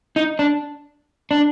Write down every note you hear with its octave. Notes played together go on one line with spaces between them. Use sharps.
D#4
D4
D4